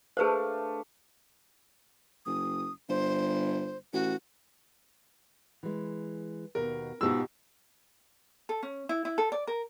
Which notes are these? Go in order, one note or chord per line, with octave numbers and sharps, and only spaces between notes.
A3 D4 G#4 B4 C5 F5
F#1 D#6
G1 C5
A1 F#4
E3 G#3
D#2 B2 A#4
G#2 B2 F4 G4 C5 E6
A4
C#4
E4
E4
A4
D5
A#4